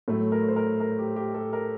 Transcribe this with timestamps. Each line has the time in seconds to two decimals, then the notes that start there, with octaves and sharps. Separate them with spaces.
0.08 A2 F#3 A3 A4
0.32 A#4
0.48 C5
0.56 A#4
0.80 A#4
0.99 G4
1.16 G4
1.34 A4
1.53 A#4